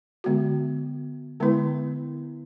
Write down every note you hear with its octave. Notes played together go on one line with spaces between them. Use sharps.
D3 G#3 B3 F#4
D3 G#3 B3 E4 B4